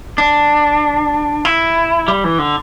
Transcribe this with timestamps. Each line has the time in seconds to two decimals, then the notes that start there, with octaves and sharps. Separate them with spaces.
0.18 D4
1.45 E4
2.08 G3
2.24 E3
2.39 D3